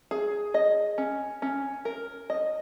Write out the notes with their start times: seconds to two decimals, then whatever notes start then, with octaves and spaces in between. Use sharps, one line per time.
0.11 G#4
0.54 D#5
0.98 C#4
1.42 C#4
1.85 A#4
2.30 D#5